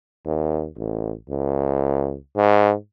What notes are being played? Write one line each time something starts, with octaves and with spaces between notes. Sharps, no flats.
D#2
A1
C#2
G#2